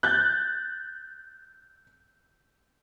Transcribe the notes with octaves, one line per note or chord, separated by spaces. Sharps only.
F#6 G6 A6